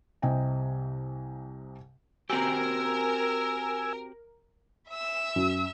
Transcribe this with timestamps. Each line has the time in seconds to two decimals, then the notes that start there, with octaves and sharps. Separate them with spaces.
0.22 C2 C3 D#5 G5 G#5
2.30 C4 F#4 G4 A#4 G#5 E6
4.90 E5 E6
5.36 F#2